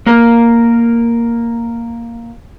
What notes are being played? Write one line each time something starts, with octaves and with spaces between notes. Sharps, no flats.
A#3 A#4